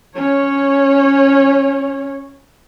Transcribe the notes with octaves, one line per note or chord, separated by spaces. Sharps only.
C#4 C#5